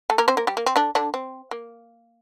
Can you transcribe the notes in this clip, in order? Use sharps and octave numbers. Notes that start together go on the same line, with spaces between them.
A3 A4
A#3 A#4
C4 C5
A#3 A#4
G3 G4
A#3
C4
D3 D4
D3 D4
C4
A#3